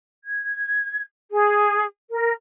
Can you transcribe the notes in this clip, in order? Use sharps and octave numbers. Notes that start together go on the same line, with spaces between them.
G#6
G#4
A#4